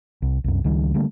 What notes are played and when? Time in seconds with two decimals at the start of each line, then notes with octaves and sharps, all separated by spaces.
0.22 C2
0.44 C2 F#2
0.64 C#2 D#3 G3
0.94 D3 G3 A3 A#3